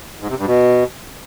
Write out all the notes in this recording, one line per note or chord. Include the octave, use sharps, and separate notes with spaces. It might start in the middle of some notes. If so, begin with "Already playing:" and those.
G#2
C3
G2
B2